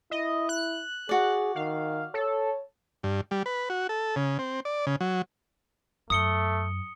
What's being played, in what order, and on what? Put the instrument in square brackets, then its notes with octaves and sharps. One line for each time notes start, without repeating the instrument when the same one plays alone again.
[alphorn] E4 [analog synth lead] D#5
[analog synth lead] F#6
[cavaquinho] F#4 D5 [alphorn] G#4
[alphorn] D#3 [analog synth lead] F5
[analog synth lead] A4 [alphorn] C#5
[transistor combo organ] G2
G3
B4
F#4
A4
C#3
C4
D5
C#3
F#3
[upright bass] F#2 [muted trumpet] A3 [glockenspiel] D#6 C#7 G7